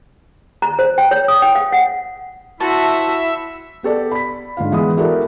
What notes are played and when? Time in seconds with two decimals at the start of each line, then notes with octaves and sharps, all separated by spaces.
0.62 A#5
0.79 C5
0.98 G5
1.11 C#5
1.28 D#6
1.42 G5
1.55 F5
1.72 F#5
2.60 E4 F#4 C5 E5 A5
3.83 B3 G4 A4 D5
4.12 B5 B6
4.57 G#2 D3 F4 F5
4.72 E3 G#3 B3 B5 D#6
4.97 E4 F#4 G4 A4 A#4 D5